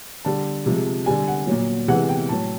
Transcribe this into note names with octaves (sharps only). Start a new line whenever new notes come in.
D3 G3 A5
C3 F3 G#3
D3 G3 G#5
F#5
A#2 F#3
C3 E3 G#3 F#5
G5
A2 F#3 A5